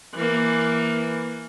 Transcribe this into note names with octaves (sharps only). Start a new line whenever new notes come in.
E3 A#3